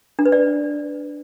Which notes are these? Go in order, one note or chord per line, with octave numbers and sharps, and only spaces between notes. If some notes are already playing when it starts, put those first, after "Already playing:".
D4
B4
D5